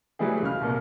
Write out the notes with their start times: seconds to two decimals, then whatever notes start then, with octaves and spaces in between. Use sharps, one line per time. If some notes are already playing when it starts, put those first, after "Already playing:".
0.19 E3 F#3 G3 A3 E4 G#4
0.42 C#2 F6
0.61 C2 A#2 A#3